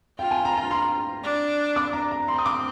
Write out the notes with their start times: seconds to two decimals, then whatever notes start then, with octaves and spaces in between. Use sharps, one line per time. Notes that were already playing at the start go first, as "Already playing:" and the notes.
0.18 F4 G5
0.31 G#5
0.45 A#5
0.58 A#5
0.71 C6
1.23 D4
1.76 D6
1.93 A#5
2.11 A#5
2.28 C4 C6
2.38 D#6
2.46 D6